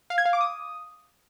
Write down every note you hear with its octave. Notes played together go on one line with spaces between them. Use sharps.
F5
G#6
F5
D6
D#6